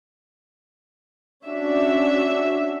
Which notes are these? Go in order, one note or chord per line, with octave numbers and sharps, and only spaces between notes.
C#4 D4 F#4 E5